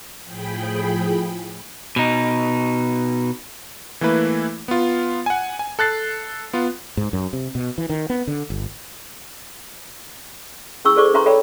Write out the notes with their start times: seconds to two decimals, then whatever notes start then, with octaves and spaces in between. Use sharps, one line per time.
0.24 A2 F3 G#4 G5 B5
1.96 B2 D#4
4.01 E3 A3 A#3 E4 B4
4.68 B3 F4
5.26 F#5 G#5
5.59 G#5
5.79 A4 F#6 A6 C7
6.53 B3 F4
6.97 G#2
7.13 F#2
7.33 C3
7.55 B2
7.78 E3
7.90 D#3
8.10 B3
8.27 D3
8.50 G1
10.85 C#4 E4 G#4 C#6 E6
10.96 G#4 A4 C5 D5 C#6 D6
11.14 C#4 B4 E5 A#5 C6 C#6
11.26 A4 C#5 D5 E5 G5 B5